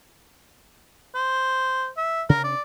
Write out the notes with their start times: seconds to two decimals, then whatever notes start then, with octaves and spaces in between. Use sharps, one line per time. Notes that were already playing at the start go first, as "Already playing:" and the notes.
1.15 C5
1.97 E5
2.29 C3 D4 A#4
2.44 D5